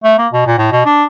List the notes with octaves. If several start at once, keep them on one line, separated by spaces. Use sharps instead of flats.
A3
A#3
B2
A#2
A2
B2
D4